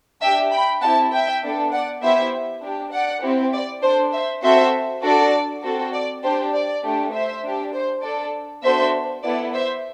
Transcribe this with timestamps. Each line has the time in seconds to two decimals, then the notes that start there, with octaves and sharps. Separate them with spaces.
0.22 D4 G4 E5 G5
0.52 G5 B5
0.82 C4 E4 G4 F#5 A5
1.12 E5 G5
1.43 B3 D4 A4
1.73 D5 F#5
2.02 B3 E4 G4 C5 E5
2.63 D4 G4
2.93 D5 F#5
3.23 C4 E4 G4
3.53 D5
3.83 D4 A4 C5
4.13 C5 E5
4.43 C4 F#4 A4 C5 E5
5.03 D4 F#4 A4 D5
5.63 C4 F#4 A4
5.94 D5
6.23 D4 G4 C5
6.53 D5
6.84 A3 D4 G4
7.13 C5 E5
7.44 D4 G4
7.73 C5
8.03 D4 A4 D5
8.63 B3 D4 F#4 A4 C5 E5
9.24 B3 E4 A4 D5
9.53 C5 E5